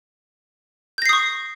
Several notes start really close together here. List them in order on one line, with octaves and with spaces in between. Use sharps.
G6 A#6 C7 D#6 C#6